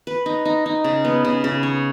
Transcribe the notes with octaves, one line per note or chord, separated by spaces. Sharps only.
B4
D#4
D#4
D#4
C#3
B3
C#3
C#3
C#5